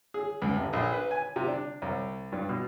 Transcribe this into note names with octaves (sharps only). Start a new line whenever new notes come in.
G#4
C#2
A1
A#1
B4
G#5
C3
D4
C2
G2
B2